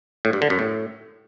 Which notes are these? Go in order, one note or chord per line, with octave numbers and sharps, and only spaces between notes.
A2
G2
D3
F#2
A2